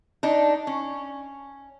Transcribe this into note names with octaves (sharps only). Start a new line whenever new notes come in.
D4 D#4
C#4